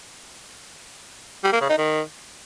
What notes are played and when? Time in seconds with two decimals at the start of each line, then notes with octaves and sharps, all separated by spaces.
1.44 G3
1.52 A#3
1.61 C#3
1.69 D#4
1.78 D#3